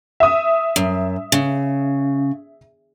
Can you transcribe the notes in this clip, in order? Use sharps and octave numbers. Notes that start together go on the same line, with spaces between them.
E5 D#6
F#2
C#3